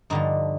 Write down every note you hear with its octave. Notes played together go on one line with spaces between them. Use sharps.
G2 D3 F3 D#4